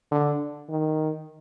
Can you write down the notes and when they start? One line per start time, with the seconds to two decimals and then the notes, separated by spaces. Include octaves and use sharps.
0.11 D3
0.69 D#3